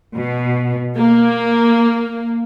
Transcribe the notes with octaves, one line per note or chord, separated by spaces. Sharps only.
B2
A#3